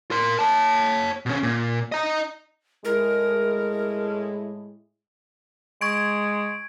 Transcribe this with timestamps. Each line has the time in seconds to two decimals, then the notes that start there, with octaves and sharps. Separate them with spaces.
0.11 A#4 C6
0.39 C#5 A5
1.26 B2 C#4
1.43 A#2
1.92 D#5 A#5
2.85 A2 G#3 E4 A#4
5.81 G#3 C#6 G#6 D7